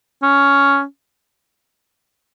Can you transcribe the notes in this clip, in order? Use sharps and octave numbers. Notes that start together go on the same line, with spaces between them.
C#4